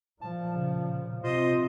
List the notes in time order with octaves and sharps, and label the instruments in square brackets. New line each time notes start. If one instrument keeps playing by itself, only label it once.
[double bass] A#2 F3 [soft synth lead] A5
[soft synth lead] C#3
[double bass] C3 [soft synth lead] F4 [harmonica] C5 D#5